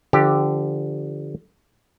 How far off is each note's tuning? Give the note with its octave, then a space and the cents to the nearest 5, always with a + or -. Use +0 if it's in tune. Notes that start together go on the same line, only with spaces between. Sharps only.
D3 +0 F3 -25 G4 +0